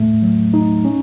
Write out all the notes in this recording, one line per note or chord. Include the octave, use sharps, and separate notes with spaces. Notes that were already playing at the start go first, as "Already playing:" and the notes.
Already playing: A2 A3
F#3
D#4
C#4